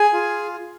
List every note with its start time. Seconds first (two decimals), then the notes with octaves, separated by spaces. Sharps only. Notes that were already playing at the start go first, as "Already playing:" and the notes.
Already playing: G#4 G#5
0.13 F4